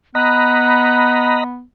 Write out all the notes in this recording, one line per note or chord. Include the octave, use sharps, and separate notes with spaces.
B3 D#5 A#5 B5 F#6